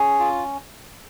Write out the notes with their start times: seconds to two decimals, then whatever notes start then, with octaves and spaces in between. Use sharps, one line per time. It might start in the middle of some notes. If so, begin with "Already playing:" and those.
Already playing: C#4 G#4
0.19 F4